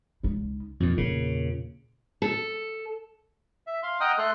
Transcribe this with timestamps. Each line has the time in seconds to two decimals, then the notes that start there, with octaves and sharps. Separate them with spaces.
0.23 C#2 D#4
0.80 F2 A#2 C#4
0.97 E2 A#2 C#3 E3
2.22 A4
3.67 E5
3.83 F5 C6
4.01 D#5 F#5 G5 A#5 D#6 F6
4.18 A3 A4 C6 F#6